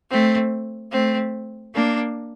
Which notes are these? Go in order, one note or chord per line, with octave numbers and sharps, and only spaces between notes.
A3 C4
A3 C4
A#3 D4